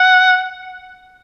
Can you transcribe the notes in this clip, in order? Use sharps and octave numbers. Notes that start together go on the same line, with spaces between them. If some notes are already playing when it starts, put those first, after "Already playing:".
Already playing: F#5